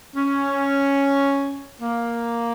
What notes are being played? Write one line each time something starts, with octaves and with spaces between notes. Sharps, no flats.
C#4
A#3